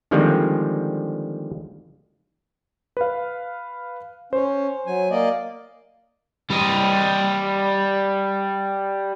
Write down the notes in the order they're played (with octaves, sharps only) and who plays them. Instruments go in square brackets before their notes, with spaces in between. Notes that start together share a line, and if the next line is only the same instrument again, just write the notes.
[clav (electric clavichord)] D3 D#3 F3 G3 G#3 C4
[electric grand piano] B4 F5
[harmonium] C#4 [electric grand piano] C5
[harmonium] F#3 G#5
A#3 D5 D#5
[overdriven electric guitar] G3 D#5